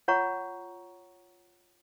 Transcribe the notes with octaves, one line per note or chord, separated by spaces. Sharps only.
F4 C#5 F#5 A#5 C#6